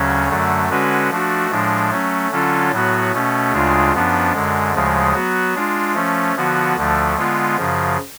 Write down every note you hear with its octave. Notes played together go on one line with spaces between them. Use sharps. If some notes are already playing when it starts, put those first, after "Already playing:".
Already playing: D2 C#3 F#3 C#4
F#2 D3 F#3 A3
D3 G#3 C#4 F#4 B4
F3 A3 D4 F#4
A2 F3 G#3 D4
F#3 A3 C#4
D3 F#3 C#4 F4 A4
A2 F#3 B3 F#4
B2 A3 C#4
D2 C#3 G#3 D4 F4
F#2 F3 B3 D4
F#2 D3 G#3
D2 C#3 F3 G#3
F#3 B3 F#4
G#3 D4 F4
F3 A3 C#4
D3 F3 B3 F#4
D2 D3 F3 A3
D3 G#3 B3 F4
F#2 C#3 F3